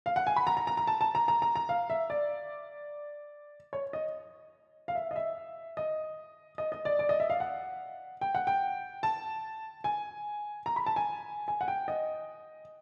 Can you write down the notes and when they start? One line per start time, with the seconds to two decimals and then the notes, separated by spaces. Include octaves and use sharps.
0.06 F5
0.16 F#5
0.27 G#5
0.36 B5
0.47 A#5
0.57 A#5
0.67 A#5
0.77 A#5
0.87 A5
1.01 A5
1.15 A#5
1.28 A#5
1.42 A#5
1.56 A#5
1.69 F5
1.90 E5
2.10 D5
3.73 C#5
3.93 D#5
4.88 F5
4.95 E5
5.11 D#5
5.16 E5
5.77 D#5
6.58 D#5
6.72 D#5
6.85 D5
6.99 D5
7.09 D#5
7.20 E5
7.30 F5
7.40 F#5
8.21 G5
8.35 F#5
8.47 G5
9.03 A5
9.84 G#5
10.66 A#5
10.76 B5
10.86 A5
10.96 G#5
11.48 G#5
11.61 F#5
11.68 G5
11.88 D#5